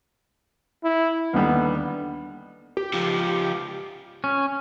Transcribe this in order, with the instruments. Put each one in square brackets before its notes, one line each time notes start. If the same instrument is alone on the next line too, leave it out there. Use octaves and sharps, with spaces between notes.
[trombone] E4
[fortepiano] D#2 D3 G3 [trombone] B3
[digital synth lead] G4
[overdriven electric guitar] C#2 F3
[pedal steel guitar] C#4